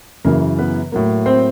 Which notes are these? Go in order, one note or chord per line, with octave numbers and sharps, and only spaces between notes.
F#2 C#3 E3 A#3 A#4
B3 B4
A2 F#3 A#3
C4 C5